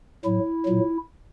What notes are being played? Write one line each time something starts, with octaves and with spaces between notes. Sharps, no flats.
A2 F#3 E4
A#2 F#3